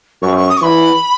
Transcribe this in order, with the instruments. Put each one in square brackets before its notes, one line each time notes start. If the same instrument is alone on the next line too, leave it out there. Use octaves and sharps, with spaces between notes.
[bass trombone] F#2 [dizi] C#6
[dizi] C#6
D#6
C#6
[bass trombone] E3 [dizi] B5